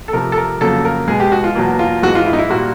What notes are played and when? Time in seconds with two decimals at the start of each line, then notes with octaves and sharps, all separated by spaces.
0.08 A4
0.13 C3 F3 A3 A#4
0.32 A4
0.38 A#4
0.61 F2 C#3 F#3 A#3 A4
0.85 A#4
1.08 B2 G#3 G#4
1.20 G4
1.32 F#4
1.44 F4
1.55 E2 B2 F#3 A#3
1.79 F4
2.02 G#2 E3 G#3 F#4
2.15 F4
2.26 E4
2.33 D#4
2.39 E4
2.50 A#2 G3 A#3 F#4